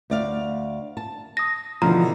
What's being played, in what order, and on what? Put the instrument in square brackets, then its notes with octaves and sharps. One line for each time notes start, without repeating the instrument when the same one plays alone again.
[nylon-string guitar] D2 D5 F5
A5
[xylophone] D#6 A#6
[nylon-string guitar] B2 D3 E3 [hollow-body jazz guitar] F3 [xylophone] A#5